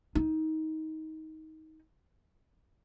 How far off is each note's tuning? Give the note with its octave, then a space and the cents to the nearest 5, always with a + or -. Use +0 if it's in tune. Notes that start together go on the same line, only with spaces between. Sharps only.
D#4 +20